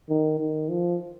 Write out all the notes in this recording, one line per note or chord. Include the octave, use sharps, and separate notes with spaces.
D#3
D#3
F3